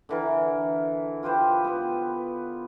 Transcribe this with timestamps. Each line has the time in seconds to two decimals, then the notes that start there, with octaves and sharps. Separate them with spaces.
0.09 D3 E3 A#4
1.23 F4 G4 B4 C5
1.65 B3 B4